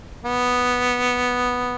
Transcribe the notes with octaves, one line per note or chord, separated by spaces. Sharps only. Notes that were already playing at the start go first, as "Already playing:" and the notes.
B3